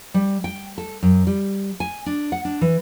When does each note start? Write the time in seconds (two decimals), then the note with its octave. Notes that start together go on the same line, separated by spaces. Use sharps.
0.14 G3
0.44 G5
0.78 A4
1.03 F#2
1.27 G3
1.80 G#5
2.06 D4
2.32 F#5
2.45 D4
2.61 E3